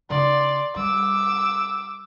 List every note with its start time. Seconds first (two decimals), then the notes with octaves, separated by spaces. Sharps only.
0.10 C#3 D#4 D5 C6
0.76 G3 D6 E6